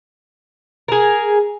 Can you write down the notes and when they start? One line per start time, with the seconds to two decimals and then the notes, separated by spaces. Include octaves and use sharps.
0.88 G#4 A#4